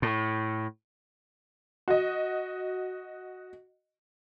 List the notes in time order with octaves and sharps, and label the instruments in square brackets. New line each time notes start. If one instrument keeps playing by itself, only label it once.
[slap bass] A2
[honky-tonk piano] F#4 D#5